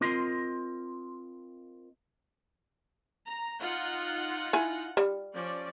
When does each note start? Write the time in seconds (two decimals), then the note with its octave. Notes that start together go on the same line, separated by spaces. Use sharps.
0.01 C4 F4 A#4 D#5 C6
3.27 A#5
3.60 D#4 F4 F#5
4.53 E4 G#5
4.97 G3
5.34 F3 C#4 D5